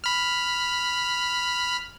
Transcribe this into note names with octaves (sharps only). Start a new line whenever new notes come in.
B5 F6